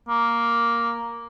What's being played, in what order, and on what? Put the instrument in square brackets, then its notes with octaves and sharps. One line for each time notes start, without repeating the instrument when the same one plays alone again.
[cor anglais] A#3